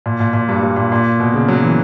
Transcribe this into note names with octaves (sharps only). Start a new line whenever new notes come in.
A#2
A#2
A#2
G2
G2
A#2
A#2
B2
C#3
F#3
E3